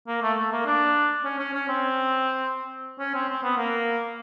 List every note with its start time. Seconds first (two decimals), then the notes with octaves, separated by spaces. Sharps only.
0.07 A#3
0.22 A3
0.37 A3
0.52 A#3
0.66 D4
1.24 C#4
1.38 C#4
1.53 C#4
1.68 C4
2.99 C#4
3.14 C4
3.29 C4
3.43 B3
3.57 A#3